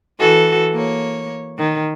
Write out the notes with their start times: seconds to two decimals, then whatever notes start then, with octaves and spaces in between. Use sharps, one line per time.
0.19 E3 F#4 A4
0.73 A#3 C#5
1.58 D#3